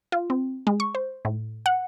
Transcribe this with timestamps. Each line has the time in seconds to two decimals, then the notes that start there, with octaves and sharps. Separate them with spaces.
0.12 F4
0.30 C4
0.67 G#3
0.80 C#6
0.95 C5
1.25 A2
1.66 F#5